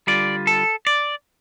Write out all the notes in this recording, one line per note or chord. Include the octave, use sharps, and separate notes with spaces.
D3 G3 F4 D5
A4
D5